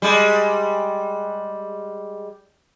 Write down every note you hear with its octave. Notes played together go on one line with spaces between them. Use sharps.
G3 G#3